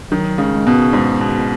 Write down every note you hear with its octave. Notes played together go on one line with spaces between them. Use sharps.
D#3 F#3
C#3 G#3
G#3
B2 B3
G#2
B2